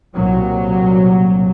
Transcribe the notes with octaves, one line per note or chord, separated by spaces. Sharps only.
C2 A#2 F#3